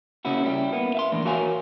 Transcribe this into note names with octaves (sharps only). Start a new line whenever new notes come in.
C#3 A#3 C#4 E4 F#4
G3 C#4 E4 G4
A#3 B3
E5 F5 C6
A2 E3 A#3 D4
F#4 A#4 C#5 F5 G#5